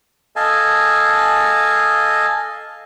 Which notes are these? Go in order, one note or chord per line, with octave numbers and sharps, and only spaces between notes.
A4 D#5 F5 G#5 A5